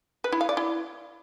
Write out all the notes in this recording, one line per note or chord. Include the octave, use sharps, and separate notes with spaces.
B4
E4
F5
D5
E4